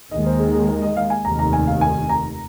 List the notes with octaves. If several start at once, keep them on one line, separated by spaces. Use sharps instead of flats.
D#2 D#3 G#3 D#5
C5
G#4
G#4
A#4
D#5
F5
G#5
F1 D#2 D#3 A#5
A#5
G#5
F5
G#5
A#5